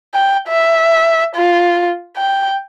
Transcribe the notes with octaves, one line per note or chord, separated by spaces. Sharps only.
G5
E5
F4
G5